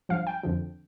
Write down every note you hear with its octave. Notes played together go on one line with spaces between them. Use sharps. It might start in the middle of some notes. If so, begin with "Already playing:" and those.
G1 G2 F3 F5
G5
F2 D3 F3